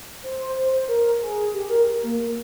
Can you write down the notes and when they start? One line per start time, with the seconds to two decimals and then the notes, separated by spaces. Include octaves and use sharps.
0.23 C5
0.40 C5
0.57 C5
0.73 C5
0.88 A#4
1.22 G#4
1.54 G4
1.70 A#4
2.03 A#3
2.19 A#3